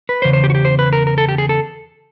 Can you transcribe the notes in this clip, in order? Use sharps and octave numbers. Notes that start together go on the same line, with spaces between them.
B4
E2 C#3 C5
C5
G4
F#4
G4
C5
B4
A#4
A#4
A4
G4
G#4
A4